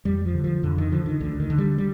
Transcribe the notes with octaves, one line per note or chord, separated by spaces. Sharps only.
F2 G3
F3
D3
F3
F2 D3
D#3
D3 F3
D#3
D2 D3
D#3
D3
G3
G3